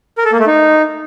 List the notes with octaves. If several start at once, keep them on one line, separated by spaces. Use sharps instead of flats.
A#4
A4
A#3
A3
D#4